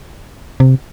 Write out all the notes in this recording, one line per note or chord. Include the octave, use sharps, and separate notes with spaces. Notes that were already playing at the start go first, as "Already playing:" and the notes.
C3